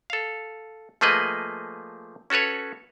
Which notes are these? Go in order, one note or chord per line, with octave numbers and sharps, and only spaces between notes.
A4 F5
F3 A3 A#3 G#4 B4 D#5
C#4 F#4 A4 B4 C#5